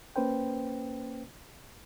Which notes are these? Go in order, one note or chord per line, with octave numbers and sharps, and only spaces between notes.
A#3 C#4 B4 C5 G5